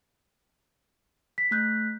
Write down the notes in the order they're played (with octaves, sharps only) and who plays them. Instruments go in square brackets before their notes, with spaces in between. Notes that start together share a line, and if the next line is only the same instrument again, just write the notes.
[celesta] B6
[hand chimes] A3 F#6 G6